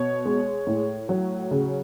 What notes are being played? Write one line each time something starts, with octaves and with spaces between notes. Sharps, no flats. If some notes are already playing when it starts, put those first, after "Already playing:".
Already playing: B2 C#5
G#3
A2
F#3
C#3